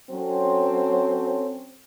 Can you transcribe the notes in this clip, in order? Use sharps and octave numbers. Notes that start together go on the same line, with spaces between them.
F#3 C4 C#4 A4 C5